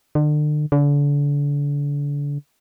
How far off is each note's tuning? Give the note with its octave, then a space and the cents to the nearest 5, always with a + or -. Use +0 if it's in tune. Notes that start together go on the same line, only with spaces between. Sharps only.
D3 +35
D3 -35